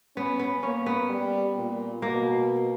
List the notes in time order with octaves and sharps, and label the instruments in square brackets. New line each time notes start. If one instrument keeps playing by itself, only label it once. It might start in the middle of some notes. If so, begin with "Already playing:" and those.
[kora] B3 [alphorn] C#4
[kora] B3
[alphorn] A#3 [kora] C#4
[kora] B3
[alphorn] G3
A#2
[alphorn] B2 [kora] A#3